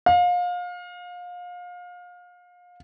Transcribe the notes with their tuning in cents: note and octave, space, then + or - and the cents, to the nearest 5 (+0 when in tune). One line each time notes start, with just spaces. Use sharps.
F5 +30